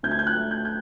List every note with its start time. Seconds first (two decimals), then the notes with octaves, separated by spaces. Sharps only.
0.03 D2 G6
0.11 G#6
0.19 G6
0.27 F#6
0.35 A3
0.51 G6
0.65 G6